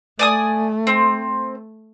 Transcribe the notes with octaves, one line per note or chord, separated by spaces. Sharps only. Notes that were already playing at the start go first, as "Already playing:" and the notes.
A3 D5 G#5 D#6
C4